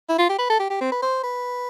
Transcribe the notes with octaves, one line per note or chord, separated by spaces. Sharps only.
E4
F4
G4
B4
A4
G4
G4
C4
B4
C5
B4